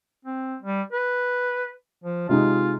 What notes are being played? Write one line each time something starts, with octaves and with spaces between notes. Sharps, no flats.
C4
G3
B4
F3
C3 G#3 D#4 F4